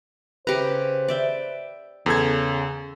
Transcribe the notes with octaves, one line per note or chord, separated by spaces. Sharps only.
C#3 G4 B4 C5 A#5
D5 E5 G5
E2 C#3 A4 G#6